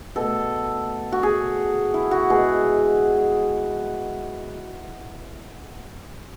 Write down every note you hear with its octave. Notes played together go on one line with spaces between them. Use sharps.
B2 A3 A4
F#4
G#4
E4
F#4
B2 G#3 G#4